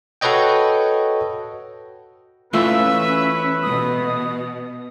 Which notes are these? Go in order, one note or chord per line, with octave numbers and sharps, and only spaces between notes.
F#4 A4 B4 C#5 D#5 G5
E3 A3 C#4 F4 B4 E5
B2 B3 D#6